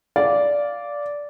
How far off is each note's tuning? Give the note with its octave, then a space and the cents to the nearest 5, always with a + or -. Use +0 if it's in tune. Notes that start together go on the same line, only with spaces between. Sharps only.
D5 -10 F5 +0